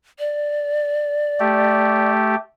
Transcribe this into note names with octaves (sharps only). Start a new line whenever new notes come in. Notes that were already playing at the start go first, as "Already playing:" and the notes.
D5
A3 G4